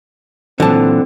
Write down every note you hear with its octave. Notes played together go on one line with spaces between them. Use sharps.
A#2 D3 E3 F#3 C4 A5